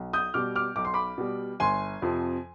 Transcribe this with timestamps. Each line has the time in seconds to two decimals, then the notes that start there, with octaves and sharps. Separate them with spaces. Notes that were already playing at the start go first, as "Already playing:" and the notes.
Already playing: B1
0.13 D#6 G6
0.34 B2 G3 D6 F6
0.56 D6 F6
0.76 B1 D6
0.85 C6
0.94 B5 D6
1.18 B2 G3
1.60 G1 G#5 C6
2.02 F2 C3 F3